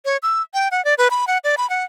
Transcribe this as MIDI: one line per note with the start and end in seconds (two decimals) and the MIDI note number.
0.05 0.17 73
0.23 0.42 88
0.54 0.68 79
0.71 0.84 78
0.85 0.94 74
0.98 1.08 71
1.11 1.25 83
1.27 1.38 78
1.44 1.55 74
1.57 1.69 83
1.70 1.84 78